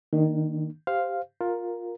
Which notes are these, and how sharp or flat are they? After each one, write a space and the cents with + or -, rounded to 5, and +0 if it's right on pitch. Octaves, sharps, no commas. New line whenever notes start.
D#3 +0 A#3 -5 D4 +30
G4 +0 C5 +0 F5 +0
F4 +15 A#4 +0